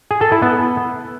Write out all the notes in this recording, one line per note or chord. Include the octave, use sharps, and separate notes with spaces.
G#4
A4
E4
B3